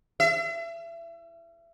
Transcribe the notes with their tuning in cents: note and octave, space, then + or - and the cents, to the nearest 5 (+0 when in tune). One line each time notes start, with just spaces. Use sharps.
E5 +30